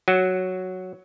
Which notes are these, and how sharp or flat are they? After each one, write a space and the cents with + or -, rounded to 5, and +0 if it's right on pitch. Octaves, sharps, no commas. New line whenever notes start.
F#3 +0 F#4 +0